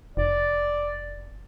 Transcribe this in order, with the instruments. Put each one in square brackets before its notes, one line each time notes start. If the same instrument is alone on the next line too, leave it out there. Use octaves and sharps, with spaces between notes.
[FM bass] F1 [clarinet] D5